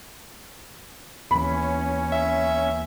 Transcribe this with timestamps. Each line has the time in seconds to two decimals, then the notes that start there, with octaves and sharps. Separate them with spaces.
1.31 D#2 E3 C#4 B5
2.12 E5